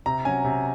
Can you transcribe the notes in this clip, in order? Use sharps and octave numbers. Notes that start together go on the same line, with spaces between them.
C3 A#5
F#3 C#4 G#5
C3